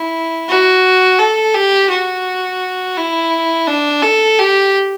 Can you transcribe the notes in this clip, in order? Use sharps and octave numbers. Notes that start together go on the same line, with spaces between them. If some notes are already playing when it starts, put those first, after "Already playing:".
Already playing: E4
F#4
A4
G4
F#4
E4
D4
A4
G4